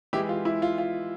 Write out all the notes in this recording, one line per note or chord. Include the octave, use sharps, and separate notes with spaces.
E3 G#3 E4 G4
F4
E4
F4
F4